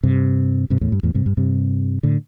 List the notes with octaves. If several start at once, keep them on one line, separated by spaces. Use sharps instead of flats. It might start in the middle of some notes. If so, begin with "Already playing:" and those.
G2 C3
G2 C3
E2 A2
G2
E2 A2
G2 C3
G2
G2 C3
A2 D3